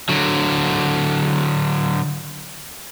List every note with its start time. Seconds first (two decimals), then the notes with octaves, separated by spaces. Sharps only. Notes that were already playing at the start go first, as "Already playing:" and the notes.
0.09 D3 F#3